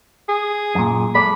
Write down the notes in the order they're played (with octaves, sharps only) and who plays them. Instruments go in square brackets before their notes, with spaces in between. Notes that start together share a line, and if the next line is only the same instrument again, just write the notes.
[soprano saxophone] G#4
[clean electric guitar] F#2 A#2
[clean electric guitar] G#3 A4 D5 [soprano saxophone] B5